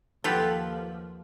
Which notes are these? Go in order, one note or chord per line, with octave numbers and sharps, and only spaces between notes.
D#2 F3 F4 G4 A4 B4 F#5